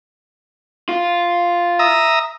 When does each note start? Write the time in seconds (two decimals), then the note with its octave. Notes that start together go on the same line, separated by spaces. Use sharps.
0.89 F4
1.79 E5 A#5 D#6